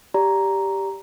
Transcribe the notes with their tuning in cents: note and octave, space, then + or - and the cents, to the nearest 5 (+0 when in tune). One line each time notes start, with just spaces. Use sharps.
G4 +0 D5 -25 A#5 +0